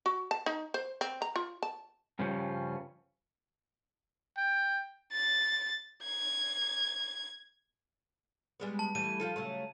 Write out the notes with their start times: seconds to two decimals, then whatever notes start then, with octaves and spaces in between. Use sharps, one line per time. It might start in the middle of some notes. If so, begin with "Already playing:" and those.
0.06 F#4
0.31 A5
0.46 D#4
0.74 C5
1.01 C4
1.22 A#5
1.36 F4
1.63 A5
2.19 G2 C#3 F3 G3 C#4
4.37 G5
5.13 A6
6.05 G#6
8.60 G3 G#3 B3
8.79 A5
8.95 E3 G3 A3 D#7
9.20 F3 F4 A4
9.36 C#3 F#3 A3